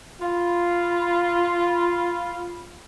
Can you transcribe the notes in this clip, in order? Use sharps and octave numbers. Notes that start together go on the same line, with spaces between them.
F4 B5